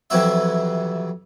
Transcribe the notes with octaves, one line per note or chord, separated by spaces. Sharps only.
F2 C3 E3 F#3 E4 E5